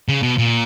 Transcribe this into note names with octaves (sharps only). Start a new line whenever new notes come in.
C#3
B2
A#2